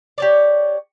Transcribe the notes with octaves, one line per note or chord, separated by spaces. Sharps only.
G4 C#5 D5